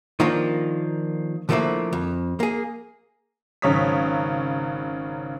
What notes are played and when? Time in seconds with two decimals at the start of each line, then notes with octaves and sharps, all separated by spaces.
0.20 D#3 F3 A#3 D4 F4
1.49 D3 F3 G3 A3 A#3 E4
1.93 F2
2.40 A#3 G#4
3.62 G#1 C#3 F#3 C#5 D#6 B6